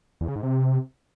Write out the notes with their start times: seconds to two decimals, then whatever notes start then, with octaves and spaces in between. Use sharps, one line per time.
0.21 E2
0.28 C#3
0.36 G#2
0.43 C3